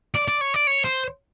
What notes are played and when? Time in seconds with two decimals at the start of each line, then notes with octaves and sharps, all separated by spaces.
0.15 D5
0.28 D5
0.41 C#5
0.54 D5
0.67 C#5
0.85 C5